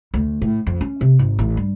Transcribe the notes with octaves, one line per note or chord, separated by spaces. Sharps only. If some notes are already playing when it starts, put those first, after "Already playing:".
D2
A2
F2
C#4
C3
G#1
A1
G2